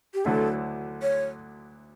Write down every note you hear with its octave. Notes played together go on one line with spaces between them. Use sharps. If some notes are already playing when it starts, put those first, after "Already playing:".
G4
D2 D3 F#3 A3 E4 A4
C#5